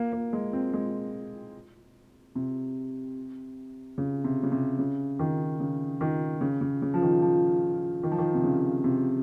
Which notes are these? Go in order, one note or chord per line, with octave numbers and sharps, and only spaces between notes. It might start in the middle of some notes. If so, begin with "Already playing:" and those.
Already playing: A#3
A#3
G#3
C4
G#3
C3
C#3
C3
C#3
C3
C#3
D#3
C#3
D#3
C#3
C#3
C#3
F3
D#3
F3
D#3
F3
D#3
C3
C#3
C3